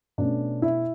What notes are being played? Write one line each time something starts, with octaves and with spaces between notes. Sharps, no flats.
B2 A3 C#4 D4
E4